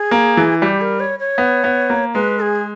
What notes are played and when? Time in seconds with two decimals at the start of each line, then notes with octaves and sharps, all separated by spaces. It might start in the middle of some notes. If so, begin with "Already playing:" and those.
Already playing: G#4
0.11 A#3
0.37 E3
0.62 G3 G4
0.81 A#4
1.00 C#5
1.19 C#5
1.38 B3
1.64 B3
1.90 A#3
2.14 G#3 B4
2.40 G#4